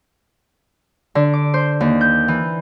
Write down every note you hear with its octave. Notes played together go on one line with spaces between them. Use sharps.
D3
D6
C5
D#2
G6
E3